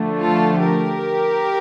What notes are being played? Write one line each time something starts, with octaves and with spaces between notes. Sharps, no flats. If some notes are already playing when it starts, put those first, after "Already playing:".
Already playing: D3 F3 A3
F4 A4
G4 A#4